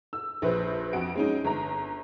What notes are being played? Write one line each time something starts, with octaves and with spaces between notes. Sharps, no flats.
E6
A#1 B4 C5
F2 F#4 D7
G#3 C#4 D#4
G1 A#5